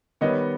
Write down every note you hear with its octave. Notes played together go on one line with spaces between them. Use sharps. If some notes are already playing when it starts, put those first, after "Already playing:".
D#3 G3 B3 C#5 D#5